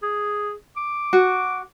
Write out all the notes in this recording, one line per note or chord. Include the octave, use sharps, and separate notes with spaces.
G#4
D6
F#4